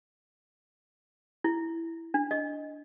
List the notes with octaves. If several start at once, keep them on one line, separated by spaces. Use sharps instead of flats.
E4
D4
D#5